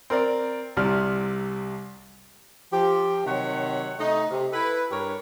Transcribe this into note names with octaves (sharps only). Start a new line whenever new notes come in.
C4 A#4 D5
C2 C3 D5 F6
F3 G4
C3 D#3 F#3 C#5 F#5
C3 A3 D#4
C3
E4 A4 B4
G2 G4 A#4 C#5